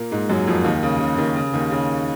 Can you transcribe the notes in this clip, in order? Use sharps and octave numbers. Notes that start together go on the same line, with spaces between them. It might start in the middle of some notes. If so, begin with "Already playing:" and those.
Already playing: A#2 A#3
G#2 G#3
F#2 F#3
F2 F3
D#2 D#3
C#3
C#3
D#2 D#3
C#3
D#2 D#3
C#3